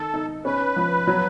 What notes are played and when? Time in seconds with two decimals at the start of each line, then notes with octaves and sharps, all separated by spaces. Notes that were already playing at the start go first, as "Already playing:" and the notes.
Already playing: D#3 A4
0.14 D#4
0.45 C#4 B4
0.76 F3
1.07 F#3